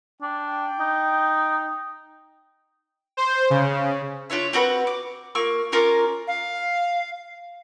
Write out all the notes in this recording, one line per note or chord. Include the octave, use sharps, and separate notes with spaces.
D4 G5
D#4
C5
C#3
D4 F4 C#5 E5
C4 F#4 A#4 B4
D6
A#3 F4 C#6 E6
C#4 F4 A#4 D6
F5